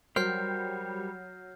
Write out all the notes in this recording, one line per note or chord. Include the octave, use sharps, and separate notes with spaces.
F#3 G3 A#4 C5 F6 G6 C7